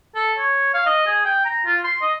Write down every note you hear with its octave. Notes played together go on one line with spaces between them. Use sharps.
A4
C#5
F5
D#5
G#4
G5
A#5
F4
C6
D#5